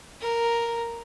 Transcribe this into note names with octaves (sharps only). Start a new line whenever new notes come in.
A#4